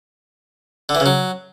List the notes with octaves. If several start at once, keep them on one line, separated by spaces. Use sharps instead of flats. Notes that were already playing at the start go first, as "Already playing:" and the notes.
D3
E3
C#3
F#3